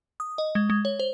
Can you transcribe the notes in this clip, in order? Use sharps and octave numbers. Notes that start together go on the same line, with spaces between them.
D#6
D#5
G#3
G#3
C#5
C5